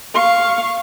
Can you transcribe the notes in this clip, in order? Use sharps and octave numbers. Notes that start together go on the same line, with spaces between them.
F5 C#6